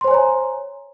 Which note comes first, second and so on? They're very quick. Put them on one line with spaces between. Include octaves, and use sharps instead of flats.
C6 C5 G#5 C#5 A#5